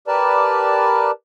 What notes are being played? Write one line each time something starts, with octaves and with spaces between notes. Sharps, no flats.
G4 A#4 B4 D5 A5